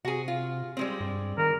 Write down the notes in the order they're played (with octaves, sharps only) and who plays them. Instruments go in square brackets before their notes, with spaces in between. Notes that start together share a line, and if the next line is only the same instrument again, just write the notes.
[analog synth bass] C3 [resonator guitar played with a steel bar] F#4 G#4
[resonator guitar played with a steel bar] F4
G3 G#3 C4
[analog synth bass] G2
[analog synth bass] D#3 [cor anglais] A#4